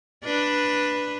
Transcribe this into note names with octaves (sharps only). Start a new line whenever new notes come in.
D4 B4